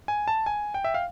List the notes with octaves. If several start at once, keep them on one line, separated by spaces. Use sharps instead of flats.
G#5
A5
G#5
G5
E5
F5